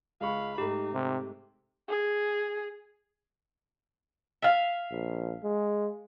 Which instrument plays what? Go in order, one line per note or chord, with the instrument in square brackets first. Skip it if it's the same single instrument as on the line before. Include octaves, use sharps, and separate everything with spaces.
[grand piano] C#2 G#3 C#6 [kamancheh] F5 B5
[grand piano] G#2 A3 [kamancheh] D#4 [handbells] G4
[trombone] C3
[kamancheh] G#4
[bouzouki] E5 F5
[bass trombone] A#1
G#3